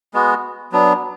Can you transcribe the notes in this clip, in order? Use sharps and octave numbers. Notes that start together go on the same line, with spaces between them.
G#3 B3 F#4
F#3 B3 D4